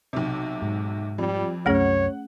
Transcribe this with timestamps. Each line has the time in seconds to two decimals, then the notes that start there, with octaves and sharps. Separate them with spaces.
0.13 B1 C3
0.62 G#2
1.18 F2 G3
1.66 C2 F#2 A3 C#4 G#4 C#5 F#5